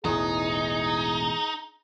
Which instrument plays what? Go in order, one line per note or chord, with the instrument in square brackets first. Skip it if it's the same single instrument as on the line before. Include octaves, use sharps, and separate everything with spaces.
[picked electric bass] E1 A1 E2 [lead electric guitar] D#4 [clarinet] G#4